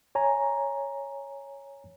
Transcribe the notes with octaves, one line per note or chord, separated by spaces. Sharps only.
C#5 G#5 A#5